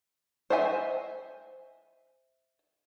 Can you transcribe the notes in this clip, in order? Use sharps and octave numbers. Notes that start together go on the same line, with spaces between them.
C5 D#5 E5 G#5